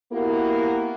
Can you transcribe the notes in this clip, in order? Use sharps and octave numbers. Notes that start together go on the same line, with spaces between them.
A#3 B3 E4 F#4 G4 A#4